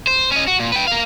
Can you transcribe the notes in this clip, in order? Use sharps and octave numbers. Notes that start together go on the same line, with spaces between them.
C5
C#4 D#5
F#4
A#2
B4 G5
A#4 F5